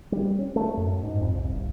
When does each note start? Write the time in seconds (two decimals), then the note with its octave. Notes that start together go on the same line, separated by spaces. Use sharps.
0.12 G3
0.39 C#4
0.56 A3
0.77 F#2
1.03 G#2
1.21 F2
1.34 C2
1.53 G1